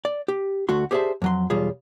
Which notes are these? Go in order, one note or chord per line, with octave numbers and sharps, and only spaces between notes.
D5
G4
D2 A3 F#4 C6
G4 G#4 C5 D5 E5 A5
F2 F#3 C6
B1 E2 G3 F4 G#4